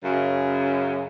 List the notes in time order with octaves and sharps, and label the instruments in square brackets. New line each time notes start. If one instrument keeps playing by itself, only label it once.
[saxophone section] F#2 C#3